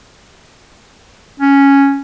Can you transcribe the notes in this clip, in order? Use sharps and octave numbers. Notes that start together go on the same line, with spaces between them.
C#4